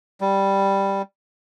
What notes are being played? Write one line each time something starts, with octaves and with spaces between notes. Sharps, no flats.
G3